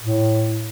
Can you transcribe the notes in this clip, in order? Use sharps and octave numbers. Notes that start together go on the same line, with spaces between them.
A2